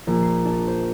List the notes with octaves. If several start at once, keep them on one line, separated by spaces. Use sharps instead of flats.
A#1
C7
D4
C5